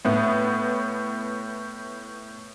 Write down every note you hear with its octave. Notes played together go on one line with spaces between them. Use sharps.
A2 B3